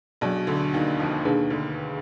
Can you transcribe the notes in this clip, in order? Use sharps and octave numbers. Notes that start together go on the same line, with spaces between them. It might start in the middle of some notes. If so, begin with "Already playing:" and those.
B1 B2 F#3 D4 G#4 D5
D2 D3
D#2 D#3
F2 F3
D#2 B2 D#3 A#3 D4 G#4 B4
D2 D3